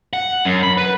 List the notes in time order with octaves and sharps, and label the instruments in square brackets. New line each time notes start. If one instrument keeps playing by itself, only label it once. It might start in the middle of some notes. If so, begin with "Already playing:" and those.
[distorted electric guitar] F#5
F#2
B5
B4